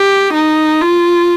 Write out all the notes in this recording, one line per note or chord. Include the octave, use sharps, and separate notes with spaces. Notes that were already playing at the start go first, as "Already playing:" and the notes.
Already playing: G4
D#4
F4